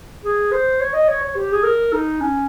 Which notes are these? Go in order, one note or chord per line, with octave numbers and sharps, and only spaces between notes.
G#4
C5
C#5
D#5
C#5
C#5
G4
G#4
A#4
D#4
C#4